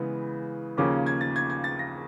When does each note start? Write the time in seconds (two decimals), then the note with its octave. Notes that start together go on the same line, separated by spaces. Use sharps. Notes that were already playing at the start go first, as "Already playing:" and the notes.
Already playing: C#3 E3 G#3 B3
0.77 D#2 C#3 F3 A#3 C#4 D6
1.06 G#6
1.21 A6
1.36 G#6
1.50 G#6
1.64 A6
1.79 A#6